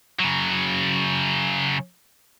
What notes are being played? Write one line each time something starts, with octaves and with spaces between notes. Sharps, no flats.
C#3 F#3